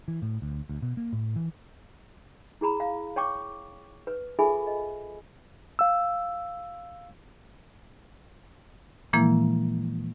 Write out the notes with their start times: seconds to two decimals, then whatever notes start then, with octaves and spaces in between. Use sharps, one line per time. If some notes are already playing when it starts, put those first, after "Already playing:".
0.08 E3
0.22 A2
0.42 D2
0.69 D2
0.82 B2
0.97 A#3
1.13 A2
1.36 E3
2.61 E4 G#4 A#5 B5
2.80 F5
3.16 C#5 G5 C#6 D6
4.07 B4
4.39 F4 G#4 A4 E5 G#5 B5
4.67 D#5
5.79 F5 E6
9.13 A#2 E3 F3 G#3 A#3 E4